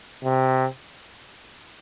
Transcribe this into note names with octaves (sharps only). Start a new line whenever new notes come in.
C3